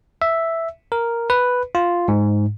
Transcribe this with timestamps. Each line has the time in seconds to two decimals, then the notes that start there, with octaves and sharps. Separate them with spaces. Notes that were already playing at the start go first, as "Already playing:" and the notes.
0.22 E5
0.92 A#4
1.30 B4
1.75 F4
2.08 G#2